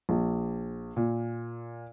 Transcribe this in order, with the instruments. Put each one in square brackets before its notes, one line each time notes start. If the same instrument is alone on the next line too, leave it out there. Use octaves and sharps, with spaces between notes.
[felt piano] A#1
A#2